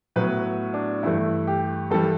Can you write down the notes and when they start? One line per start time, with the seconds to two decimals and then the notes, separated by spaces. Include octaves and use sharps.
0.16 A2 F#3 B3 B4
0.74 D4
1.03 G2 E3 A3 E4
1.47 G4
1.91 G2 E3 G3 A4